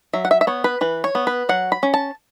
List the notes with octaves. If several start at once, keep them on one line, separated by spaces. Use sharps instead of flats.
F#3 E5
F#5
E5
E5
B3 C#5
B4
E3 B4
C#5
B3
B4
F#3 F#5
B5
C#4
A5